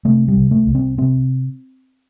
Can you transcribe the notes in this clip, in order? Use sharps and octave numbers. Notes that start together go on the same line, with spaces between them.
C3 A3
G3
C2
A3
C2
C4
C3 C4